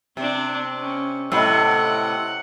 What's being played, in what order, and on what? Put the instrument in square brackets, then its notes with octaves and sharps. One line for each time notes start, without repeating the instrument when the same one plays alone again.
[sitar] C3 [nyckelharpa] C4 D4
[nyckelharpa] C#4
[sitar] A2 C3 [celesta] D#5 B5 E6 [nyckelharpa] F#5